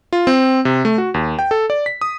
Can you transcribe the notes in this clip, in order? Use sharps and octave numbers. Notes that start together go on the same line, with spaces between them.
F4
C4
C3
A3
F#4
D#2
G5
A4
D5
B6
D#6